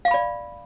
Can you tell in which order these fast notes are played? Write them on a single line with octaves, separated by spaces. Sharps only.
F5 C#6 B5 D5